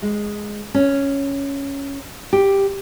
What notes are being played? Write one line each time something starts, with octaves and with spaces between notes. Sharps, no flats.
G#3
C#4
G4